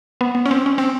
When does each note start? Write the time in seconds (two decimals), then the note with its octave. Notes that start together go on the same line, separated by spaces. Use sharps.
0.21 B3
0.35 B3
0.46 C#4
0.51 C4
0.66 C#4
0.78 C4